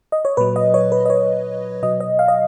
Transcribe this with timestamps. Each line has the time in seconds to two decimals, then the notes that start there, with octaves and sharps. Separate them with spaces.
0.12 D#5
0.25 C#5
0.37 A#2 F#3 B4
0.56 D#5
0.74 C#5
0.92 B4
1.06 D#5
1.10 C#5
1.83 B2 F#3 D#5
2.00 D#5
2.19 F5
2.28 D#5